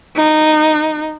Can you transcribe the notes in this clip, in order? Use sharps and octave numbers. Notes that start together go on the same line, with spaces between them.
D#4